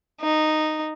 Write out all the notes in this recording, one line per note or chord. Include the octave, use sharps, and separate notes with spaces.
D#4